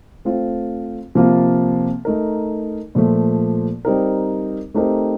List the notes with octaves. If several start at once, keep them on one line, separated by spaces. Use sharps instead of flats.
A3 C4 F4
C3 F3 A#3 F4
A3 D#4 A#4
A#2 F3 A3
G3 C4 D#4 A#4
A3 C4 D#4 G4 A#4